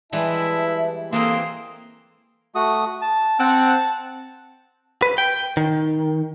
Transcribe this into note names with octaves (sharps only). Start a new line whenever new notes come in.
E3 G3 G#3 E4 B4 E5 A5
E3 A#3 C4 A4 A#4 C6 D#6 E6
A3 F#4 D#6
A5
C4 F#5 A5
B4
G5
D#3